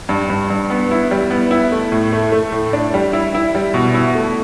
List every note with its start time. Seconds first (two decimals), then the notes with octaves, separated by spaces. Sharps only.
0.09 G2
0.30 G2
0.50 G2
0.70 B3
0.91 E4
1.11 G3
1.30 B3
1.51 E4
1.72 A3
1.92 A2
2.13 A3
2.32 A3
2.52 A2
2.73 D4
2.94 G3
3.13 E4
3.34 E4
3.55 G3
3.74 B2
3.94 E4
4.15 A3